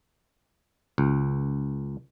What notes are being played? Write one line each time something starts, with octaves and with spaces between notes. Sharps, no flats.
C#2